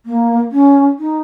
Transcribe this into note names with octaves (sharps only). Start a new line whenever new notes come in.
A#3
C#4
D#4